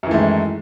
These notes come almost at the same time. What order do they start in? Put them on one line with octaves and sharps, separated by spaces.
F#2 E3 D#3 A3 G#3